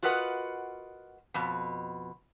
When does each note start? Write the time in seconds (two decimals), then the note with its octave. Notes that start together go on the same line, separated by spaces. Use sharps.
0.03 F4 F#4 A#4 B4 D#5 F#5
1.34 F2 B2